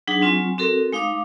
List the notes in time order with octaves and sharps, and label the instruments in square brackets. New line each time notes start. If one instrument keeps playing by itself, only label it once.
[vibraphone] F#3 D4 D#4 G#4 F#5
F#3 C4 F4 G#5 C#6
C4 F#4 A4 A#4
G#3 D#4 F5 D6 D#6